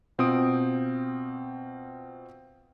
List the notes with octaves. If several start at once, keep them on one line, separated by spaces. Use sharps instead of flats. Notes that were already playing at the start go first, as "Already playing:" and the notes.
B2 C4 F4 G5 D#6 D7